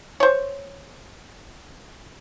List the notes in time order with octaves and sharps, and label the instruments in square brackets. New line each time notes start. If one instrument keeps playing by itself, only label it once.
[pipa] C5 C#5